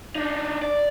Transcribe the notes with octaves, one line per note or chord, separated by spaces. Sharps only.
D4 D#4
D5